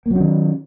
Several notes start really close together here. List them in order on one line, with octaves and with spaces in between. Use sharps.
A#3 F#3 C#4 D#3